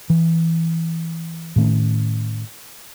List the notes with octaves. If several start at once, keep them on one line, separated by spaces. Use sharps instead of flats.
E3
A2 D#3 A3 C#4